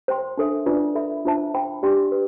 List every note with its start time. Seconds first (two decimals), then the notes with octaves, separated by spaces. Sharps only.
0.08 C5 G5 C6
0.37 D4 A4 C5 E5
0.66 D4 F4 B4 D5
0.95 A4 E5 B5
1.25 D4 F4 C5 E5 A5
1.54 C5 G5 B5
1.83 D4 G4 D5 G5 C6
2.12 B4